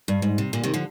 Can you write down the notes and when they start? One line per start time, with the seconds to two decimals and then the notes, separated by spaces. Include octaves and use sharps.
0.08 G2
0.22 G#2
0.38 C3
0.53 A#2 D3
0.64 C3 D#3
0.74 D3 F3